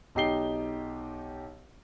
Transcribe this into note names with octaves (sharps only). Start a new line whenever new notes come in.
B1 D#4 G4 C7 G7